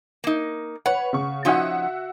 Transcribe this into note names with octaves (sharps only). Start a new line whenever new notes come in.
A#3 D#4
B4 C#5 F#5
C#3 C#6
F3 C#4 D#4 F#4 E5 F#5